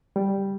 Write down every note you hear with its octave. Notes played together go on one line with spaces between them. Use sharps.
G3